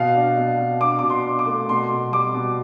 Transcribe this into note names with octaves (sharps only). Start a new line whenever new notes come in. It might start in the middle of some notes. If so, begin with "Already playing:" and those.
Already playing: B2 F5
D4
B2
B2
D4 D6
B2 D6
C6
D4
D6
A3
B2 C6
B2
G3 D6
B2